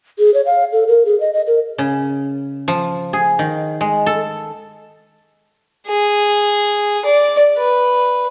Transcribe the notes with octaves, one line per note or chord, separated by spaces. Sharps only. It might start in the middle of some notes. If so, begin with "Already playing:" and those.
G#4
C#5
F5
A4
A#4
G#4
D#5
D#5
A#4
C#3
F3
G#4
D#3
G#3
A4
G#4
D5
B4